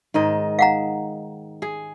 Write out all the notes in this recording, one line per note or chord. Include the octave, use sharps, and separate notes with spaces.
G#2 D#3 D#5
F5 F#5 A#5
G#4